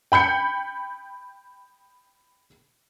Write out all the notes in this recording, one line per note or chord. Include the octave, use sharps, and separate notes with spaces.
G5 B5 G6 C#7